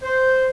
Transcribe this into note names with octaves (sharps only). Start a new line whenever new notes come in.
C5